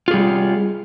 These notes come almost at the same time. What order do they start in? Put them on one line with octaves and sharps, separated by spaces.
F4 G#4 G3